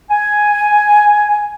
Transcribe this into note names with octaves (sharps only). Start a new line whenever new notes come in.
G#5